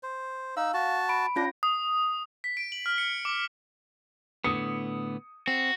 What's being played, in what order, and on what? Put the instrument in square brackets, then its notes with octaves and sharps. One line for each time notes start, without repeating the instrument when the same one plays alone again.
[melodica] C5
[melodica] D#4 E6 [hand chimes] F5
[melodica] F#4 A5
[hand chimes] B5 D7
[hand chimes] C#4 F4 A#6 [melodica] D4
[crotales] D#6
B6
D7
F#7
F6
C#7
D6
[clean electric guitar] A2 D3 B3 [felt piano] D#6 C#7
[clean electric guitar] C4 [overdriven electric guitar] F#4